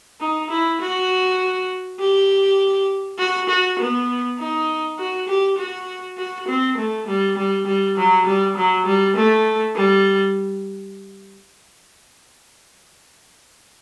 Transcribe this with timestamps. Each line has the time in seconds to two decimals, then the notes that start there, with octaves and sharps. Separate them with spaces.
0.20 D#4
0.50 E4
0.81 F#4
1.99 G4
3.18 F#4
3.49 F#4
3.79 B3
4.39 D#4
4.98 F#4
5.28 G4
5.58 F#4
6.17 F#4
6.48 C4
6.78 A3
7.08 G3
7.37 G3
7.66 G3
7.97 F#3
8.26 G3
8.57 F#3
8.86 G3
9.16 A3
9.76 G3